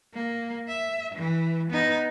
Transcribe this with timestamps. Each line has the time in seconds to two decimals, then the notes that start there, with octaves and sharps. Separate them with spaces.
0.14 A#3
0.68 E5
1.15 E3
1.70 B3 D#4